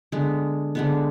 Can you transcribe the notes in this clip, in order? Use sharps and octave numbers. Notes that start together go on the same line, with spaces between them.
D3 G#3 B3
D3 G#3 B3